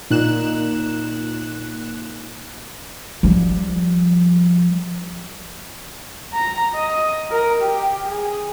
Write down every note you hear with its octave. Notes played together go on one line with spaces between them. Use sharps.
A#2 D#4 F#6 E7
F3 G3
A#5
D#5
A#4
G4
G#4